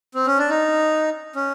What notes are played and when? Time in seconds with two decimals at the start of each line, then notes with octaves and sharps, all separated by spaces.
0.15 C4
0.27 C#4
0.38 D4
0.50 D#4
1.36 C#4